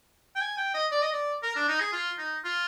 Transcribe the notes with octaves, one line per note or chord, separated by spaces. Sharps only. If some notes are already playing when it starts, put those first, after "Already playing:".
G5
G#5
G5
D#5
D5
D#5
D5
A#4
D4
D#4
G#4
F4
D#4
F4